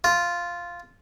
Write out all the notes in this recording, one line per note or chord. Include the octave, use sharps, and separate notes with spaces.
F4